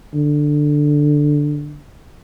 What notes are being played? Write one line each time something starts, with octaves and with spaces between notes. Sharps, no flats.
D3